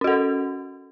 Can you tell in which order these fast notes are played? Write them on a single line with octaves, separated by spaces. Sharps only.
C#4 F#4 A4